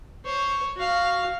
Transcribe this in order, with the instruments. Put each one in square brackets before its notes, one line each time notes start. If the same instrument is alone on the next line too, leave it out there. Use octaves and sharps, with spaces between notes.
[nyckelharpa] C5 C#5
F#4 F5